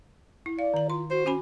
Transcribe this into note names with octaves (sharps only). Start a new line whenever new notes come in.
E4
D5 F5
D#3 A#5
F4 C6
F#4 C5
C#4 F#4 G#5 B5